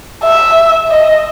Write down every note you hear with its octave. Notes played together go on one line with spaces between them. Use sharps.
E5
D#5